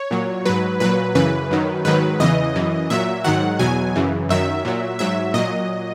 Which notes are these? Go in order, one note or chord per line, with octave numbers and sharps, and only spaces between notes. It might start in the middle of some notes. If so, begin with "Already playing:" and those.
Already playing: C#5
A#2 F#3
G#2 F#3 B4
A#2 F#3 B4
F#2 C#3 E3 B4
F#2 D#3 F#3
G#2 D#3 F#3 B4
E2 C#3 E3 D#5
F#2 E3
A#2 F#3 E5
G#2 D#3 F#3 F#5
E2 B2 F#3 G#5
F#2 C#3 E3
F#2 D#3 F#3 E5
A#2 F#3
G#2 F#3 E5
A#2 F#3 D#5